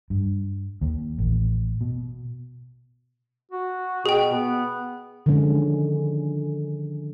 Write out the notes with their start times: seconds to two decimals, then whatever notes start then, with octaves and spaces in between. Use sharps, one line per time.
0.10 G2
0.81 D#2
1.18 A1
1.81 B2
3.51 F#4
4.06 B2 G#4 G5
4.32 B3
5.26 D3 D#3 F3 G#3 C#4